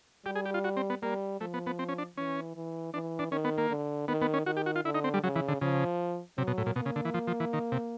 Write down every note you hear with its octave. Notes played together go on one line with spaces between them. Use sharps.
G3 G4
G#4
G4
F4
F#4
C4
B3
G3 A#3
F3 A3
B3
B3
C4
C#4
D4
E3 C#4
E3
E3 D4
D4
D#3 C#4
B3
A#3
D3
D#3 B3
B3
C#4
D#3 F#4
G4
F#4
F4
D3 E4
D#4
C4
G3
C#3 F#3
E3
D3
C#3 F3
C3 F#3
B2
A2
A#2
B2 A#3
C#3
D3
E3
F3
F3
E3
D#3
C3